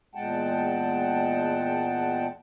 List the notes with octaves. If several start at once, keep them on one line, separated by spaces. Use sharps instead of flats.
E2 A#2 G#3 F#5 G5 A5